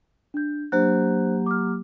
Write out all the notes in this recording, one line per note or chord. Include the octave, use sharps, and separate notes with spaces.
D4 G6
F#3 A#3 D4 G4 C5 F#6
D6 F6